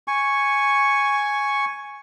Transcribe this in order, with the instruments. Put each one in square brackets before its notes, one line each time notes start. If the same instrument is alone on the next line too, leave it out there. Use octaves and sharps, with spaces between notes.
[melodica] G#5 C#6